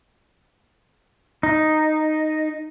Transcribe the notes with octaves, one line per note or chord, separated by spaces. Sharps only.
D#4